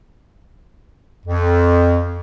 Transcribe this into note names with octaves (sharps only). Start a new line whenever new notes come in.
F2